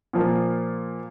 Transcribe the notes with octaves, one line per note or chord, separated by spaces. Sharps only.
A#2 F3 A#3